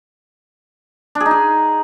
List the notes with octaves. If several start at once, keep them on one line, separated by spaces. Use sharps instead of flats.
D4
G#4
D#4
G#4